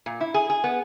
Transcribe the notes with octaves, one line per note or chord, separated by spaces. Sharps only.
A#2
E4
G#4
G#4
B3